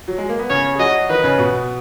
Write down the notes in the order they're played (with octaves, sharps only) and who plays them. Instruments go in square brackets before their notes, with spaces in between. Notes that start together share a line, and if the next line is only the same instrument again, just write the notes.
[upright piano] F#3
G#3
A#3
B3
[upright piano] C#3 C#4 [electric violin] C#5
[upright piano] G#4
[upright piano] F#3 F#4 [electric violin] D#5
[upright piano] D#3 D#4 [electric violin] B4
[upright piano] C#3 C#4
B2 B3